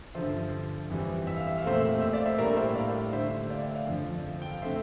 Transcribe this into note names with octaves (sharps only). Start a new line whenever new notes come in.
G2 D3 F3 C5 E5
F2 E3 G3
E5
F5
E5
F5
A#2 A3 C4 C5 E5
C5 E5
D5 F5
C5 E5
A2 G3 A#3 D4 A#4 D5
C5 E5
D5 F5
D3 A3 D4 C5 E5
D5 F5
E5 G5
D5 F5
F2 D3 F3
G5
F5
D3 A3 C4 C5 E5